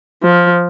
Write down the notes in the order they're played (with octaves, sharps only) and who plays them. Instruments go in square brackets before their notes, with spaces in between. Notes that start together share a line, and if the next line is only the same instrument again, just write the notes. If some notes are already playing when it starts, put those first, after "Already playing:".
[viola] F3